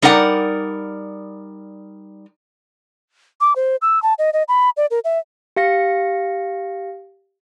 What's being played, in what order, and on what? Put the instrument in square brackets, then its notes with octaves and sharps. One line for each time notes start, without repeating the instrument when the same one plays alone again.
[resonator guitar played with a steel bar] G3 D#4 A#4 D5 F#5
[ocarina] D6
C5
E6
A5
D#5
D#5
B5
D5
A#4
E5
[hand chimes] G4 F5 A#6 C#7